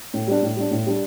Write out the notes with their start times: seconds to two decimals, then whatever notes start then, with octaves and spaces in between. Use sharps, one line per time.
0.14 A2
0.27 G3 D4
0.43 A2
0.56 G3 D4
0.71 A2
0.87 G3 D4